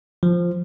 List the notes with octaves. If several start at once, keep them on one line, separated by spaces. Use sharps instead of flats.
F3